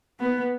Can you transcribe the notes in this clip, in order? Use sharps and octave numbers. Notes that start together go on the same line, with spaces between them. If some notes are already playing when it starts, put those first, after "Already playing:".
B3